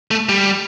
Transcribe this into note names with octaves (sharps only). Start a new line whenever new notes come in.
A3
G3